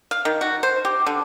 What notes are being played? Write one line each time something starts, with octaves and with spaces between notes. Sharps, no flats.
F5
D#3
F#4
C5
G4
D3